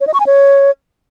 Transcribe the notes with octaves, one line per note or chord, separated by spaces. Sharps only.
C#5
D#5
C#6
G#5
C#5